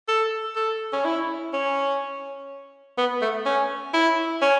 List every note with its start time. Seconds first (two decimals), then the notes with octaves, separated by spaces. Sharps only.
0.08 A4
0.56 A4
0.93 C#4
1.05 E4
1.53 C#4
2.98 B3
3.22 A3
3.45 C#4
3.94 E4
4.42 C#4